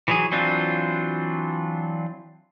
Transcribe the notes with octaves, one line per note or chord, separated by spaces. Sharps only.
E3 F#3 G#4
E3 F#3 C4 D4 F4